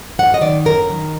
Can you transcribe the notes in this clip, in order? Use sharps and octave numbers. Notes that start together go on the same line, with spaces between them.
F#2 F#5
D#5
D#3 D5
F#2 A#4
D#3